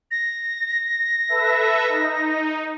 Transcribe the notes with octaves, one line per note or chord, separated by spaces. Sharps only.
A#6
A4 B4 E5
D#4